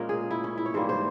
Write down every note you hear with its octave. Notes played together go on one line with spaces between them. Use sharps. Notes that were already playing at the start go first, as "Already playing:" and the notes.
Already playing: A#2 G#3 C#4 A#4
G#4
E4
C#4
E4
C#5
G#2 E3 G3 A#3 C5
C5